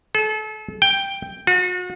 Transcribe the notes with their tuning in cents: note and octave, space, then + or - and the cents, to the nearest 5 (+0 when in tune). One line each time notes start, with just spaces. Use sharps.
A4 -35
G5 +5
F#4 -40